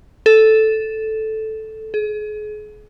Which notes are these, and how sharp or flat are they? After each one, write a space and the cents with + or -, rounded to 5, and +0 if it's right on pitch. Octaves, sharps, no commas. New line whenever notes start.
A4 -5
G#4 +35